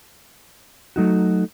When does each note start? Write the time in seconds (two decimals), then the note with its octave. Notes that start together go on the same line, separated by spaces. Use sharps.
0.96 F#3 A3 D#4 F#4